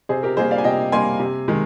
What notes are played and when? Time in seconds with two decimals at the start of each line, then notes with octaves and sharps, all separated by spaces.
0.09 C3 G#4 C5
0.23 G4 A#4
0.37 G3 A#3 G#4 C5
0.51 D5 F5
0.58 G#5
0.64 C3 D#5 G5
0.92 G3 A#3 G#5 C6
1.19 C3
1.48 D#3 G#3